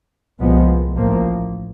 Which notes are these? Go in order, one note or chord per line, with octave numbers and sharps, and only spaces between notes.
C2 A#2 F3 G#3 B3
A1 A2 F3 A#3